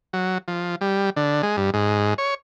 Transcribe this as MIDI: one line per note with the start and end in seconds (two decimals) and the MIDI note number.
0.13 0.38 54
0.48 0.76 53
0.81 1.10 55
1.16 1.42 50
1.43 1.56 56
1.57 1.70 43
1.74 2.14 44
2.18 2.34 73